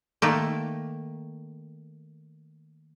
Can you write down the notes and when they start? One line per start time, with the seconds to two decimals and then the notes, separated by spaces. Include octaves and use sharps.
0.22 D#3 A3 A#3